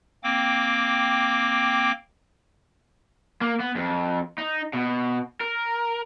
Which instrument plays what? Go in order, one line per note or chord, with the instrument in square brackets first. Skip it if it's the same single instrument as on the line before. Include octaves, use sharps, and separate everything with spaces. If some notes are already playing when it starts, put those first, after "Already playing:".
[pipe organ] A#3 C4 G5 D6
[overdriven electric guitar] A#3
B3
F2
D#4
B2
A#4